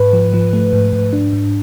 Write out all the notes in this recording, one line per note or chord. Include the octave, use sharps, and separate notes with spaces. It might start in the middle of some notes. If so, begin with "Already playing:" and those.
Already playing: G#2 B4
F3
F3
A3
G#2
G#2
D4
G#2